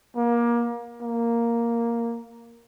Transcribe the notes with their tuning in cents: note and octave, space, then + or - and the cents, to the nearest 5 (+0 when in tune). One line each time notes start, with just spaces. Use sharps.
A#3 +25
A#3 +0